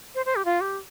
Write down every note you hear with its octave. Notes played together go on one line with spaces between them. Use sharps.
C5
C5
G4
F4
G4